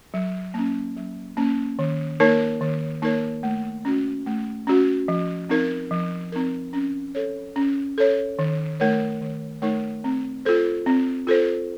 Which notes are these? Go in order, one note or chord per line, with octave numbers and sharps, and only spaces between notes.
F#3
A#3 C#4
F#3
A#3 C#4
D#3
A#3 D#4 A#4 C#5
D#3
A#3 D#4 A#4 C#5
A3
C#4 F#4
A3
C#4 F#4
F3
C4 D#4 A#4
F3
C4 D#4 A#4
C#4
A4 C#5
C#4
A4 C#5
D#3
A3 D#4 A#4 C#5
D#3
A3 D#4 A#4 C#5
C4
F4 A4 C5
C4
F4 A4 C5